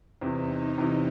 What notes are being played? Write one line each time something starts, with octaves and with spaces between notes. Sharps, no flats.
E2 C3 E3 D#4
E2 C3 E3